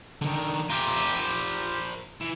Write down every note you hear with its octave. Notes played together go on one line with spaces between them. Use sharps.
D3 D#3
F4 G4 A#4 C5
E3